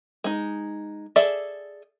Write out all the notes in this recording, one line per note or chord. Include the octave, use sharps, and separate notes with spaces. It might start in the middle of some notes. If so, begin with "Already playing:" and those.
G#3 D#4
G#4 A4 D5 E5